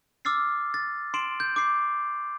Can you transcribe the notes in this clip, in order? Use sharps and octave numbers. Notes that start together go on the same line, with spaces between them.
D6 E6 F6 A6 C7
A6
C6 C7 D7 E7 F#7
G6
D6 G6 C7